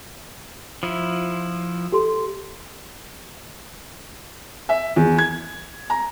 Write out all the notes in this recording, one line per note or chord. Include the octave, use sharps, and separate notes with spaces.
F3 E4
G4 A4 C6
E5
E2
G#6
A#5